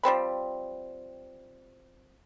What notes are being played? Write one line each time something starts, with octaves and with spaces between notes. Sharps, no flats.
F3 G3 C4 B5